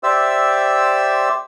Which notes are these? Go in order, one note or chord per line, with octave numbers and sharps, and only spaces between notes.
G4 C5 D5 E5 E6